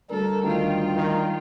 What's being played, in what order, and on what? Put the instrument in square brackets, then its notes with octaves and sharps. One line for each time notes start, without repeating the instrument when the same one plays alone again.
[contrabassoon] D2 [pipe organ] G3 [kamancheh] A4 [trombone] A#4
[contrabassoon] D2 [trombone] D#3 [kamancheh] F4 G5
[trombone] D#3